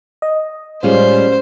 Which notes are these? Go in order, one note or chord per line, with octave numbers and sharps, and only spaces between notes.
D#5
A2 G3 G#3 C#4 F4 C5